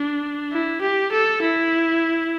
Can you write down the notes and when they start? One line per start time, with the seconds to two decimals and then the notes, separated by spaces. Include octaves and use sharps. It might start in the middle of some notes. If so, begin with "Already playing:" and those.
Already playing: D4
0.52 E4
0.82 G4
1.12 A4
1.42 E4